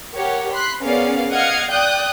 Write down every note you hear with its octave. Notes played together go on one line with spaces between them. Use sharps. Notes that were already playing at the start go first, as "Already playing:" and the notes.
G4 A#4 C#5 F#5
B5 C6 F#6
B3 C#4 G#4 A#4 D5 F5
D#5 F5 F#5 D#6 F6 G#6
D5 G5 D#6 F#6 G6